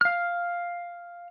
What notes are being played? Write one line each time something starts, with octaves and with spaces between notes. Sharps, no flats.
F5 F6